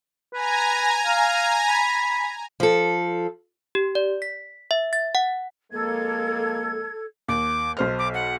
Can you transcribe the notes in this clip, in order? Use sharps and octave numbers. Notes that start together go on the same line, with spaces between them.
B4 G#5 A#5
F5
B5
F3 A4
G4
D5
B6
E5
A6
F#5
F2 G#3 A#3 A4 G#6
D#2 D6
B1 C5 F6
D6
F#5